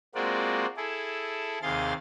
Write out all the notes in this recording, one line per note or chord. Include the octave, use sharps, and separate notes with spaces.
G#3 A#3 C4 F4 F#4 D5
E4 G#4 A4
D#2 C3 G#4 F5 C6 A6